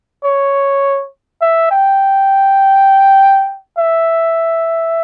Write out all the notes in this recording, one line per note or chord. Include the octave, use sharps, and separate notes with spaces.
C#5
E5
G5
E5